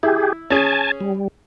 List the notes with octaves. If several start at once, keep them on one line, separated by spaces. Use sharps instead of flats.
E4 G4 G#4
C#4 G#4 G#5 A5
G3